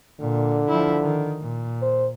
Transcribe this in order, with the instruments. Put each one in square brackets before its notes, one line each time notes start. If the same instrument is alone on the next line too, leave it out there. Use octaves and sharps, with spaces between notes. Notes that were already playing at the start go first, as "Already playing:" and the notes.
[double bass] A#2 [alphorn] D3
[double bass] F3 E4
D#3
A#2
[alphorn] C5